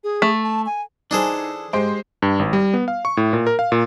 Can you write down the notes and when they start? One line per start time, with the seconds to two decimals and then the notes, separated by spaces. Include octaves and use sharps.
0.04 G#4
0.22 A3
0.44 A5
0.66 G#5
1.11 E3 D4 D#4 G#4 A4 C5 G#5
1.73 G#2 G#3 G4 C5 D7
2.22 G2
2.39 G#1
2.53 G3
2.74 B3
2.88 F5
3.05 C#6
3.17 A2
3.33 A#2
3.47 A#4
3.59 F5
3.72 A#2